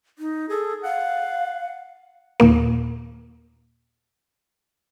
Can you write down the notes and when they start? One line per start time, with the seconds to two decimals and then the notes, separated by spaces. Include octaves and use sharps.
0.19 D#4
0.49 G#4 A4
0.83 F5 F#5
2.40 D#2 A#2 A#3